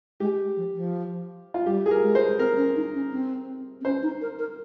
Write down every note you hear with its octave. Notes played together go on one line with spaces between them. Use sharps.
G#3 G4
F3
F3
F4
G3 G4
G#4
A#4
G#3
C5
C4 A#4
C#4
D#4
C#4
C4
C4
C#4 C5
D#4
A#4
A#4